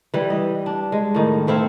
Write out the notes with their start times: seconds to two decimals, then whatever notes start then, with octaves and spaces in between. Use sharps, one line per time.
0.14 E3 G3
0.30 D#5
0.66 D4
0.92 G#3
1.15 A2 D#3
1.47 A3 C4 E4 F5